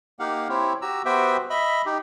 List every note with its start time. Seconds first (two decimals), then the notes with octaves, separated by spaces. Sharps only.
0.19 A#3 D#4 G4 F5 F#5
0.49 C4 E4 G4 C5 C#5
0.82 F#4 G4 A#5 E6
1.05 B3 F#4 G4 C5 E5 G5
1.50 D#5 E5 B5
1.86 D#4 G4